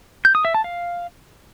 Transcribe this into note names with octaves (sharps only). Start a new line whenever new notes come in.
G6
D#6
E5
A5
F5